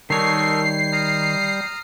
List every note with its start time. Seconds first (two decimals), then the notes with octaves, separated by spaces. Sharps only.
0.10 D#3 G3 D#4 A4 A#4 C#5 C7
0.92 A#5 D#6 F6